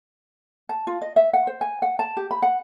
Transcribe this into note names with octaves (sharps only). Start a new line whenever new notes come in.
A5
F4
D#5
E5
F#5
C5
G#5
F#5
A5
G4
B5
F#5